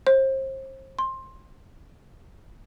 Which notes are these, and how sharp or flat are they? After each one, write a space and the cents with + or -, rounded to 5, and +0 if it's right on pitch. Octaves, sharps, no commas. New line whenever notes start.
C5 +35
C6 +15